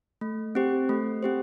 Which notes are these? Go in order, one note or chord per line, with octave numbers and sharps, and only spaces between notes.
A3
C4 G4 C5
A3
C4 G4 C5